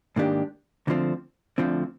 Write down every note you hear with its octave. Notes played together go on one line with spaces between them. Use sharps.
G#2 D#3 A#3 D4 G4
D2 D3 F3 C4
D2 D3 F3 C4